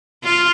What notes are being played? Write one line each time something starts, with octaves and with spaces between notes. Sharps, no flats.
F4